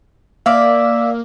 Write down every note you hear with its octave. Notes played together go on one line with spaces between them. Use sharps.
A#3 D5 E5 F5